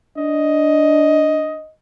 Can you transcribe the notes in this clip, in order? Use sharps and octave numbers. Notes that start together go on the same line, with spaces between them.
D4 D#5